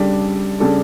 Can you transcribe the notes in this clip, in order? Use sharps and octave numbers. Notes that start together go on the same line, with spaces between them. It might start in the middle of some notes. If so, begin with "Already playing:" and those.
Already playing: C#3 G3 D4 A4
C#3 G3 D4 A4